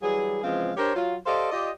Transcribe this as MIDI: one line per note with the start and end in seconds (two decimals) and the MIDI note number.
0.02 0.40 52
0.02 0.40 54
0.02 0.40 55
0.02 0.40 68
0.43 0.72 49
0.43 0.72 52
0.43 0.72 53
0.43 0.72 56
0.43 0.72 60
0.43 0.72 77
0.77 0.94 62
0.77 0.94 67
0.77 0.94 70
0.77 0.94 72
0.77 0.94 73
0.96 1.16 54
0.96 1.16 65
1.26 1.50 67
1.26 1.50 69
1.26 1.50 72
1.26 1.50 74
1.26 1.50 75
1.26 1.50 77
1.51 1.70 65
1.51 1.70 67
1.51 1.70 74
1.51 1.70 75